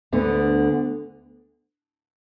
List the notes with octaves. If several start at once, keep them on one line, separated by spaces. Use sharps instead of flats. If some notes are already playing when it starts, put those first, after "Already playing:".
D2 D3 B3